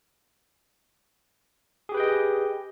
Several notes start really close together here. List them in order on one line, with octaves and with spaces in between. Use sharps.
G#4 G4 B4 G5 D#5